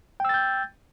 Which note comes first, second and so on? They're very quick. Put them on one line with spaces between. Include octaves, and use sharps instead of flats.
G5 E6 A6 G6